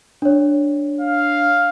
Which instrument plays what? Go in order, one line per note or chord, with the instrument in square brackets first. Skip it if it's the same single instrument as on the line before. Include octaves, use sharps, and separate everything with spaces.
[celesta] D4 C#5
[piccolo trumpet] F5